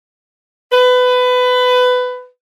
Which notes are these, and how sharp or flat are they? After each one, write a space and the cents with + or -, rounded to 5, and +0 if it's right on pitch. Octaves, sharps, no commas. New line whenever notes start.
B4 +20